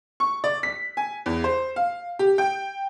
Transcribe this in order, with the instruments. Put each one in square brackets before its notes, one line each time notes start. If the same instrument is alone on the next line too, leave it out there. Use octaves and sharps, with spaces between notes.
[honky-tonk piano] C#6
D5
B6
G#5
E2
C5
F5
G4
G5